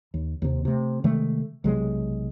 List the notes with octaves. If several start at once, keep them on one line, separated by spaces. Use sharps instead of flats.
D#2
D#2 C3
C3 A3
C3 D#3 G#3 A3
B1 C3 F#3 G#3